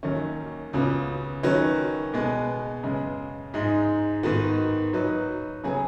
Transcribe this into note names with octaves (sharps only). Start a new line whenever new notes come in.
D#2 D#3 F#3 C#4
C#2 C#3 B3 F#4
D#3 F#3 C#4 F#4 B4
B2 G#3 B3
F#2 C#3 G#3
G#2 G#3 D#4
G#2 D#3 B3 F#4
F#3 D#4 F#4 B4
C#3 F#3 B3 G#4